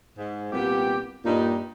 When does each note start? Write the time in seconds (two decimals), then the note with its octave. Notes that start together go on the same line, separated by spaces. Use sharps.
0.16 G#2
0.52 C2 A#2 B3 G4
1.24 G2 A#2 D#4